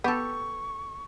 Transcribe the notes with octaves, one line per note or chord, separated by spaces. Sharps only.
B3 G4 A4 C#6